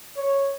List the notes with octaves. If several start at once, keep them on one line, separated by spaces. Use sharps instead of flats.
C#5